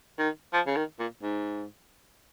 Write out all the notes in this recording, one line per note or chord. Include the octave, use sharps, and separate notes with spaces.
D#3
F3
C#3
D#3
A#2
G#2